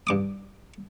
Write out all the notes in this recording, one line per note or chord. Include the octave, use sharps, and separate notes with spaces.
G2 D6 D#6